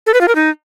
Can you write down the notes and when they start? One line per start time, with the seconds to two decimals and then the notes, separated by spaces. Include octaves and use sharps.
0.07 A4
0.14 B4
0.21 F4
0.28 A#4
0.35 D#4